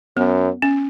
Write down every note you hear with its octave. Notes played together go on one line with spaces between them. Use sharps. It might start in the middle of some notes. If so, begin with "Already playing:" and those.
F#2 B3
C#4